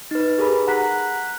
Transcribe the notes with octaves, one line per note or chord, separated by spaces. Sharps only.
D#4 B4
G4 G#4 A#4 B5
F#5 A#5 F#6 B6